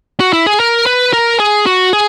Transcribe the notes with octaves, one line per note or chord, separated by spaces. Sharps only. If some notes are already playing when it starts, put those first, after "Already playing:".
F#4
E4
G#4
A#4
B4
A#4
G#4
F#4
G#4